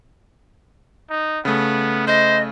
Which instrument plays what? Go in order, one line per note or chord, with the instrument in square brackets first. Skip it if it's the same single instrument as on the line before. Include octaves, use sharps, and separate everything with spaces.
[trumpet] D#4
[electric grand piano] C#3 A3 [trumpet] B3
[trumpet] C5 [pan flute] D#5